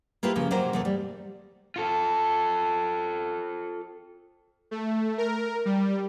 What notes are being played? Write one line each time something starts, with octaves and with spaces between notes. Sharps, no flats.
A#3 E4 F4 G4 B4
C#3 F3 A#3
C3 F#3 A#3 A#4 C5
E2 A3 A#3
G3
F4 A4
A3
A#4
G3